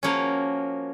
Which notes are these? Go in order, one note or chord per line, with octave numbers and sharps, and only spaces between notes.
F3 A#3 C#4 F#4 A#4